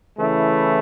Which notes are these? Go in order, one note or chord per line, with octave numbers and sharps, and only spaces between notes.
C#3 E3 A3 E4